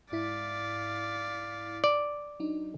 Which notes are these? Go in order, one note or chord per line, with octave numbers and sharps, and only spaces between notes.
G#2 E4 D5 F5 B6
D5
F#3 D4 D#4